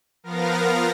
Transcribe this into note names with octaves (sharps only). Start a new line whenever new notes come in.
F3 B3 A#4 F5 A#6